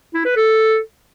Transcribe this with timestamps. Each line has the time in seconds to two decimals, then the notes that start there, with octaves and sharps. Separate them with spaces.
0.14 E4
0.25 B4
0.36 A4